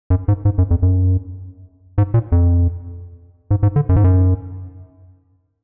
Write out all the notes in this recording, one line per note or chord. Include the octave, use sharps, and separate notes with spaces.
F#2
G#2
G#2
F#2
F2
F#2
G#2
A#2
F2
G#2
G#2
D3
F#2
G#2
F#2